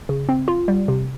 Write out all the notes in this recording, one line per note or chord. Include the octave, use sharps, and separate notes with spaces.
C#3
C4
F4
G3
C3